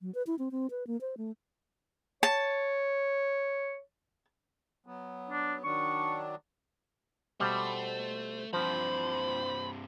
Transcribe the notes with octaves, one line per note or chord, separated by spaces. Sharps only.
F#3
B4
E4
C4
C4
B4
A#3
C5
A3
C#5 A5
F#3 B3
D4
D#3 F#3 D4 C#6
B2 G3 A3 C5
G2 C3 F3 D4 F4 C5 B5